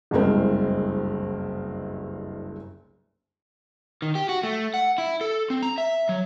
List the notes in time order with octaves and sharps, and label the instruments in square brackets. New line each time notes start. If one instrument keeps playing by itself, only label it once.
[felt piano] F#1 C2 G2 G#3 C4 A#4
[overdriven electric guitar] D#3
G4
F#4
A3
F#5
E4
A4
C4
A#5
E5
F#3